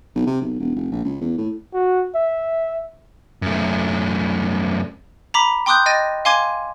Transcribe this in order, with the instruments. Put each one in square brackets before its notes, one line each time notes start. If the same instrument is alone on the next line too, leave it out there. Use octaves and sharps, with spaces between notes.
[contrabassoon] B1
C3
B1
E1
F1
A#1
C#2
E2
A2
[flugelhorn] F#4
E5
[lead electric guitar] F#2 A3
[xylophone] A#5 B5 D6 B6
G5 C6 D6 D#6 F#6 G6
D#5 G5 A6 A#6 D#7
F5 G#5 C6 D6 G#6 D#7